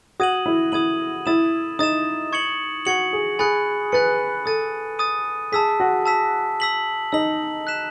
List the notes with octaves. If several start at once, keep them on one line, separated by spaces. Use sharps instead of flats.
F#4 D#6 G#6 D#7 F#7
E4
E4 D#6 G#6 D#7 F#7
E4 D#6 A6 E7
D#4 D#6 A6 E7
C#6 G#6 C#7 F#7
F#4 C#6 G#6 C#7 F#7
G#4
G#4 G#5 B5 F#6 A6 C#7
B4 G#5 B5 F#6 A6 C#7
A4 D#6 A6 D#7
D#6 A6 D#7
G#4 A5 E6 B6
F#4
A5 E6 B6
E6 B6 F#7
D#4 E6 B6 F#7
F#6 B6 E7